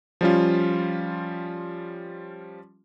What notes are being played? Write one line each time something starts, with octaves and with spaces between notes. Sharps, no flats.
F3 G3 C#4 F4